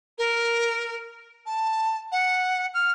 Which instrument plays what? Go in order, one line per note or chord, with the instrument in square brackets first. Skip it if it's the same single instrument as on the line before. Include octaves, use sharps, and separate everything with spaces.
[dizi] A#4
A5
F#5
F6